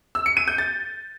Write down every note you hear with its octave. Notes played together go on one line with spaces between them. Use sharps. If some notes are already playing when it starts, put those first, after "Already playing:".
E6
C#7
D#7
G6
A6